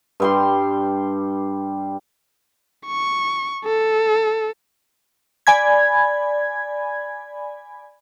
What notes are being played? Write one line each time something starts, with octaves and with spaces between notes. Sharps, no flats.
G2 G3 C6
C#6
A4
D5 G#5 B5 G#6